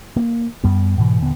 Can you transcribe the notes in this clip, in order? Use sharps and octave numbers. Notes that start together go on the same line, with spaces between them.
A#3
F#2 G3 B3
G#2 B2 E3
D#1 D3 B3